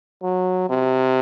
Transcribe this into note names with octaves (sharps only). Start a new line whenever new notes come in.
F#3
C3